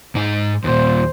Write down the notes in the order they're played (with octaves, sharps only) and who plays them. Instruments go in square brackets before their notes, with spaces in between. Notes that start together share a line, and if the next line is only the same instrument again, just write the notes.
[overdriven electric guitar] G#2 D#4
[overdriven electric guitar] D#2 A#2 [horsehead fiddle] C5